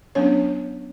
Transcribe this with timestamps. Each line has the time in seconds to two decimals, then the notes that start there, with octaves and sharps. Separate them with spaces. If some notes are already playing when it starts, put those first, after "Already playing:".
0.15 F#3 B3 C#4 D4 C#5